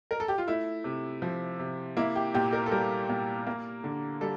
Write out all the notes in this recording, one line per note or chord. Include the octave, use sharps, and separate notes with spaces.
A#4
A4
G4
F4
A3 E4
C3
F3
C3
A#3 E4
G4
A#2 G4
A#4
A4
G3 A#4
A#2
A#3
D3
G3 A4